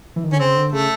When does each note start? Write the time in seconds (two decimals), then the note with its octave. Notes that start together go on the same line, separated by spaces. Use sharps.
0.16 E3
0.24 D#3
0.32 D3 C#4
0.39 C#3 C4
0.56 D3
0.72 C#3 A3